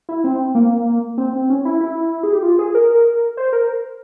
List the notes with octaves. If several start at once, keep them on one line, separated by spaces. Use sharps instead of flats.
E4
C4
A#3
C4
C4
C#4
E4
E4
G#4
G4
F4
G#4
A#4
C5
A#4